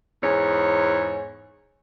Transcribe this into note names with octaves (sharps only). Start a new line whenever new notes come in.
E2 G#2 C#5